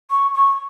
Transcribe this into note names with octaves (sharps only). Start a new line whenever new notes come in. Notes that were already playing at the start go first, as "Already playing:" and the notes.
C#6
C#6